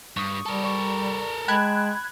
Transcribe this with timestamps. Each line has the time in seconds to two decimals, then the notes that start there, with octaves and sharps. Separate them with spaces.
0.17 G2 C#6 D#6
0.46 G3 A4 A#4
0.64 D5 C#6
1.48 G#3 G5 A5 B5 F#6 G#6